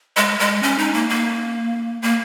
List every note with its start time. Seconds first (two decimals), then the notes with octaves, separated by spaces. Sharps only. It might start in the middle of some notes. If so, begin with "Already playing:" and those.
0.17 G#3
0.39 G#3
0.63 C#4
0.78 D#4
0.94 A#3
1.10 A#3
2.02 A#3